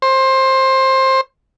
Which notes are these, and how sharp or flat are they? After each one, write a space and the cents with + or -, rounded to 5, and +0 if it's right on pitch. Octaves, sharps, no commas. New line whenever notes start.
C5 +20